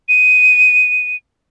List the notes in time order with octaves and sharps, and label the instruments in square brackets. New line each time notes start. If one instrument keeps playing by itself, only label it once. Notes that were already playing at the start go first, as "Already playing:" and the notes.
[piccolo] D#7